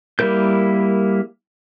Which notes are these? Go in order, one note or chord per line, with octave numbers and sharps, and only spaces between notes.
G3 A#3 E4 A#4 G6